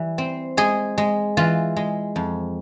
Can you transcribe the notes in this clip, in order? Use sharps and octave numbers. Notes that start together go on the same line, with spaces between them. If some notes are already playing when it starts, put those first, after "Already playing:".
Already playing: E3 G3
C4
G#3 G#4
G#3
E3 F4
G#3
F2